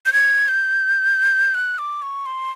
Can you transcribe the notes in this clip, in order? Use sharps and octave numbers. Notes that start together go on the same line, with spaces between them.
G6
G#6
G6
F#6
D6
C#6
C6